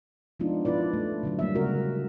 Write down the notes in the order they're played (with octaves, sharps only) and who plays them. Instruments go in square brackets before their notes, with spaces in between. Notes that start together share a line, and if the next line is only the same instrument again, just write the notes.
[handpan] F3 G#3 B3 D4 D#4 F4
F3 E4 F4 B4 D5
A3
D3 F#3 A3
G3 A#3 E5
C#3 G#3 C#4 F#4 A#4